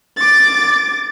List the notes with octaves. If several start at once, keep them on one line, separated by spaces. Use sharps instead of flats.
D6 A6